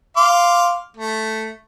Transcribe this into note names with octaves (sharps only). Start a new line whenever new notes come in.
F5 C6 D6
A3